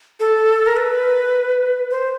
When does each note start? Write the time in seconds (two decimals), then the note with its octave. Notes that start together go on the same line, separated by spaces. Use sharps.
0.20 A4
0.66 A#4
0.77 B4
1.91 C5